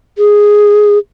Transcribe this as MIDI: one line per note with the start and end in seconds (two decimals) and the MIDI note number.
0.18 0.98 68